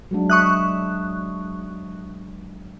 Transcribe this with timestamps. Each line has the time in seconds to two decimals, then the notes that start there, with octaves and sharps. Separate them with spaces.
0.11 F#3 G#3 D4
0.30 E5 C#6 D#6 F#6